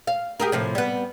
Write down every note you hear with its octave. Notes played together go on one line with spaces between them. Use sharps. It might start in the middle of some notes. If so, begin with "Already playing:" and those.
F5
G4 G#4 A#4
A2 C3 F3
G3 B3